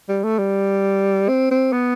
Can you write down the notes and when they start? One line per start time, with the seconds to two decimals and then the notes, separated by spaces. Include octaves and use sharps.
0.09 G3
0.24 A3
0.38 G3
1.29 C4
1.51 C4
1.72 B3